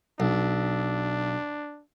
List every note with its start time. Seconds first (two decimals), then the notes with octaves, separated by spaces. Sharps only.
0.20 B1 D4